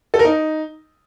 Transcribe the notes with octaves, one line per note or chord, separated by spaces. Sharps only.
A4
A#4
D#4